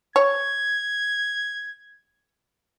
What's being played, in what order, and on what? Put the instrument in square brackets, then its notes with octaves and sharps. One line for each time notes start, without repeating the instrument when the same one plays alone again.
[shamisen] C#5 [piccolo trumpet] G#6